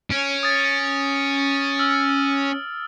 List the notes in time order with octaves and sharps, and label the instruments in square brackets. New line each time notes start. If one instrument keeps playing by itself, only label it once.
[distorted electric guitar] C#4 [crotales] D7
[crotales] D#6 A6
E6 F6